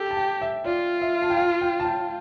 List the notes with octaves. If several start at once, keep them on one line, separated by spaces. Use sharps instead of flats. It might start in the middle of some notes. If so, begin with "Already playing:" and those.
Already playing: G4 A4
A5
G5
E5
F4 D5
E5
A5
G5
F5
G5
A5
G5